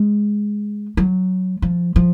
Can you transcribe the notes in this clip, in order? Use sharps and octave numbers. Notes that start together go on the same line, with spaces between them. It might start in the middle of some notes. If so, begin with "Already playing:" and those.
Already playing: G#3
F#3
F3
F3